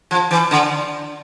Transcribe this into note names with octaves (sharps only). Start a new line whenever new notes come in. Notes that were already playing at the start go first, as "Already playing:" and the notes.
F3
E3
D3